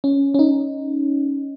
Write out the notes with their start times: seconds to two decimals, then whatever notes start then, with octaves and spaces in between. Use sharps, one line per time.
0.04 C#4
0.34 C#4
0.39 D#4